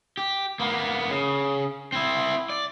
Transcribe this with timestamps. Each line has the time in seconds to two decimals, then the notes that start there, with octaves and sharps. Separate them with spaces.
0.17 G4
0.60 A#3 B3
1.10 C#3
1.92 C4 E4
2.50 D5